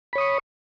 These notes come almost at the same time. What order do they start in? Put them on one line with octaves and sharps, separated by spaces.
B5 C#5 D#6 C#6